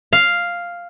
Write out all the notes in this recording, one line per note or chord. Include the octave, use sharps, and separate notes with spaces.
F5